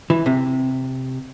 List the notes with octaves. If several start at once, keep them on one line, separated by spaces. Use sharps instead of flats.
E3
C3